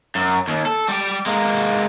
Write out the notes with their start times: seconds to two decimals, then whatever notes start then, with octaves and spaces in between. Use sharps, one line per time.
0.15 F#2
0.48 D#2
0.66 A4
0.88 G3 G4
1.26 G#3 A#3